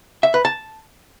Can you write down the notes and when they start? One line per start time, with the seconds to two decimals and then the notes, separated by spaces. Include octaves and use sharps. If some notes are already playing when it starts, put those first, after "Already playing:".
0.23 E5
0.34 B4
0.45 A5